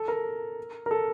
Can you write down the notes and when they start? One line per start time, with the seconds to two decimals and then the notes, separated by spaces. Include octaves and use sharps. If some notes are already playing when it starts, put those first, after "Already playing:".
Already playing: A4
0.08 A#4
0.86 A#4
0.91 A4